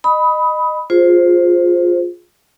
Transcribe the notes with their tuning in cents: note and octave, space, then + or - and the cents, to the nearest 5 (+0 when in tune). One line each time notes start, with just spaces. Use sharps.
D#5 -20 B5 +0 D#6 +20
F4 +15 G#4 +0 C5 +0